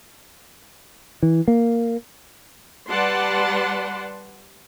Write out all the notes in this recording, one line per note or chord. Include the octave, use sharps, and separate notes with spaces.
E3
A#3
G3 B4 D5 F#5 A5 C6